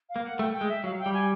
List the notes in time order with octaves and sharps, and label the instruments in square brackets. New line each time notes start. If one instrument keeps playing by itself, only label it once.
[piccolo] F5
[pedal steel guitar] A#3
[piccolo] F#5
[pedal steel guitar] A3 [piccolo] G5
[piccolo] G5
[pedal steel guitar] G#3
[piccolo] E5
[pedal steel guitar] F#3 [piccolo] F5
[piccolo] G5
[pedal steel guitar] G3
[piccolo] G#5